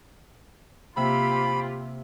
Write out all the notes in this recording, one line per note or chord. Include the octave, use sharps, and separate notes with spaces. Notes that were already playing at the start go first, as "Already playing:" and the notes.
C3 A#3 F4 G4 E5 B5